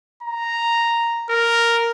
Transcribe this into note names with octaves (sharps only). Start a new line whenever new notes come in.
A#5
A#4